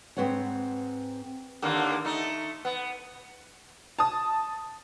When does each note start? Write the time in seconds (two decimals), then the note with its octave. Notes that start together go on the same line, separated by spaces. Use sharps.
0.17 G#2 F3 C4 B4 C#5 F#5
1.62 D#2 D3 A#3
2.05 A3 D#4
2.65 B3
3.99 A5 D#6